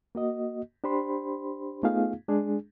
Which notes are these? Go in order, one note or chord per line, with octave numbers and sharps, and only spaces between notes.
A#3 F#4 D#5
D4 G4 C5 B5 C6
A3 B3 D#4 F4 G#4 F5
G#3 D4 G#4